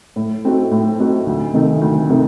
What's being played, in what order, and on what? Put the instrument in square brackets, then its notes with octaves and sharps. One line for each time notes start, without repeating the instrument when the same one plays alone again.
[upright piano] A2
A3 C4 D#4 F#4
A2
A3 C4 D#4 F#4
D2
C3 D#3 A3 D#4
D2
C3 D#3 A3 D#4